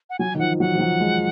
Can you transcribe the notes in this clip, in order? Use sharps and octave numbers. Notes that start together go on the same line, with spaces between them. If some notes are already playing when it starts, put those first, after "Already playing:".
F#5
F#3 G#5
D#3
F3 F#5
F#3 F#5
F3
F#3
G#3